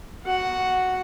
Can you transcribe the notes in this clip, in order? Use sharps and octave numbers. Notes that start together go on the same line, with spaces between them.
F#4 F#5